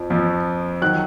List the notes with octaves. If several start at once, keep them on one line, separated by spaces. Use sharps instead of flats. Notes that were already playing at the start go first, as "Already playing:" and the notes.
Already playing: F2 F3
F2 F3
D#3 F#3 F#6